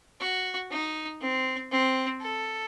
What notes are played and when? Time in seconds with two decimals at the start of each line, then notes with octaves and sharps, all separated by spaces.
0.20 F#4
0.71 D#4
1.21 C4
1.71 C4
2.22 A4